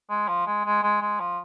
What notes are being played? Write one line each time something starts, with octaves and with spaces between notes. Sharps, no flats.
G#3
F3
G#3
G#3
G#3
G#3
F3